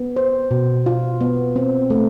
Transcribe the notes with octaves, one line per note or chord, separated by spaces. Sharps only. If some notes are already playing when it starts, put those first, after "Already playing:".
Already playing: B3
C5
B2
F4
B3
C4
A3